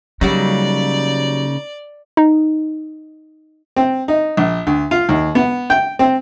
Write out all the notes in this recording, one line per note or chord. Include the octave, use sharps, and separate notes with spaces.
C#3 F#3 G3 A#3 C#4 D#4 F#4 D5
D#4
C4
D#4
A#1
D2
F4
D#2
B3
G5
C4